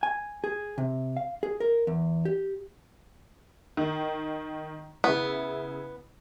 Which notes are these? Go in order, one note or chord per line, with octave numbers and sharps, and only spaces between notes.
G#5
G#4
C3
F5
G#4
A#4
E2
G4
D#3
C#3 B3 E4